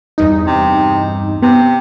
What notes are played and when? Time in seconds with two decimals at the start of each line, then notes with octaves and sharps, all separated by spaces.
0.18 E2 G2 D#4
0.47 C3
1.42 C3 B3